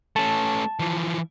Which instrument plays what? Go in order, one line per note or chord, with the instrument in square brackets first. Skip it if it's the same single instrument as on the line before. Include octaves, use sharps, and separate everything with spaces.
[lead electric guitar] A3 C#4 [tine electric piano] A5
[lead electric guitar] E3 F3